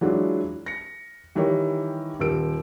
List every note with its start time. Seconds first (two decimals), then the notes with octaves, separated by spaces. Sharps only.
0.01 E3 F#3 G#3 D4 F4
0.66 A#6 C#7
1.35 D#3 E3 G3 G4 A#4 C#5
2.20 D#1 G4 A#4 E6 D7